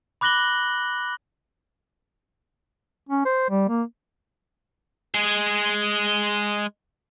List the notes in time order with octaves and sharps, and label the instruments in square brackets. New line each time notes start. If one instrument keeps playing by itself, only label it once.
[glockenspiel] B5 D6 F#6 A#6 F#7 G7
[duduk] C#4
C5
G3
A#3
[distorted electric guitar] G#3 G#4